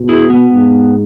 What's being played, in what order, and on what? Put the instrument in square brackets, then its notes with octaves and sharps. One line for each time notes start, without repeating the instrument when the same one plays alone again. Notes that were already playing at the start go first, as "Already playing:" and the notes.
Already playing: [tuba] B2
[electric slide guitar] E4 G#4
B3
[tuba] G#2